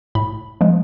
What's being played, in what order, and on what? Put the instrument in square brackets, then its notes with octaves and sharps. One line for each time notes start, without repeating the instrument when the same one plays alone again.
[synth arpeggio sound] A2 B5
F3 G#3